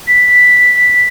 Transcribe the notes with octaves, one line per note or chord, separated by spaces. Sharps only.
B6